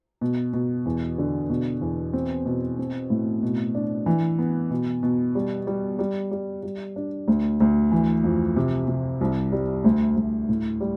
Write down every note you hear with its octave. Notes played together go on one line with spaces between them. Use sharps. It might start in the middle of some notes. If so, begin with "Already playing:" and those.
B2
B2
E2
D3
B2
E2
C4
B2
C4
A2
B2
D4
E3
B3
B2
B2
G3
G3
G3
G3
G3
D4
D2
D2
E3
F2
C3
C3
C2
G3
D2
D2
A2
G3